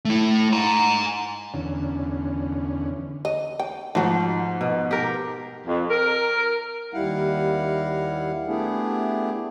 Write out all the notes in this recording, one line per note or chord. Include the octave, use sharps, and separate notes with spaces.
A3 E4
G#5 A#5
E2 D3 C#4
D#5
G5
G#2 F3 A3 F#4
B2
G4 A#4
F2
A#4
D#2 G3 E4 F5 F#5
A3 B3 D4 E4 G4 G#4